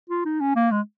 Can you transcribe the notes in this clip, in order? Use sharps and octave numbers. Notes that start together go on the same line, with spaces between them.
F4
D#4
C#4
A#3
G#3